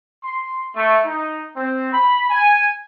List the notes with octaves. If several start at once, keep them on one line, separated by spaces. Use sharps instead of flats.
C6
A3
D#4
C4
B5
G#5